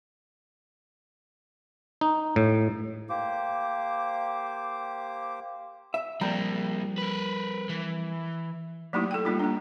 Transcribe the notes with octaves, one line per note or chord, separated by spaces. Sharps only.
D#4
A2
A#3 G4 C5 D6
E5
F2 F3 G3 A#3 A#5
A#4 B4
E3
F#3 A3 A#3 D#4 E4 G4
A4 G5
G3 A#3 D#4 F4
A#3 D4